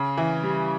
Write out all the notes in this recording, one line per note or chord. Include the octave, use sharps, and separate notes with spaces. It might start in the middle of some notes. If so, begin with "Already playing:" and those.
Already playing: C#3
E3
G3